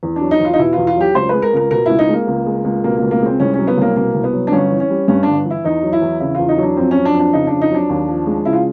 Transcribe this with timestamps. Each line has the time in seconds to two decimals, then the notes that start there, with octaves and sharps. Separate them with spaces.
0.03 E2
0.16 F#3 D4
0.31 D#4
0.40 E2
0.45 F4
0.53 D#4
0.58 B2 E4
0.73 E2 F4
0.87 F4
0.96 F#3 G4
1.14 C#2 C5
1.29 G#3 B4
1.42 A#4
1.53 C#2 A#4
1.71 B2 A#4
1.86 C#2 E4
1.99 D#4
2.09 G#3 A#3
2.27 C#2
2.46 G#3
2.64 C#2
2.84 B2 A#3
2.97 C#2 A#3
3.11 A#3
3.22 G#3 C4
3.40 C2 C#4
3.54 F#3 C#4
3.67 B3
3.77 C2 A#3
3.96 B2 A#3
4.14 C2
4.24 B3
4.33 F#3
4.47 D4
4.52 G1 C#4
4.71 E3
4.80 C#4
4.90 G3
5.08 G2 C#4
5.23 G1 D4
5.45 E3
5.50 E4
5.64 E2 D#4
5.83 F#3
5.93 E4
6.02 E2
6.20 C#3 E4
6.35 E2 F4
6.49 D#4
6.58 F#3
6.63 D4
6.77 F2 C4
6.91 F#3 C#4
7.05 D4
7.14 F2
7.20 D4
7.33 C#3 D#4
7.47 F2 D4
7.61 D#4
7.71 F#3 D4
7.89 D#2
8.09 F3
8.27 G#3
8.45 C#3 E4
8.53 F4